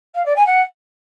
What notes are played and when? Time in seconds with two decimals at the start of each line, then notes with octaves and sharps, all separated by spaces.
0.15 F5
0.25 D5
0.36 G#5
0.46 F#5